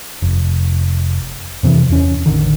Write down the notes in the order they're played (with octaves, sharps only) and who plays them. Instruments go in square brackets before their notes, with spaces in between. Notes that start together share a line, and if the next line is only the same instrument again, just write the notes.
[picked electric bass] F1
F2 C3 D#3 E3
E2 C#4
A1 D3 D#3